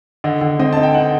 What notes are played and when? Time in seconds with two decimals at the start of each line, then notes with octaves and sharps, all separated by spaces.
0.24 D3 D#5
0.41 D3
0.59 C4 D#5
0.73 D#4 A5
0.83 G5
0.94 D#4 F#5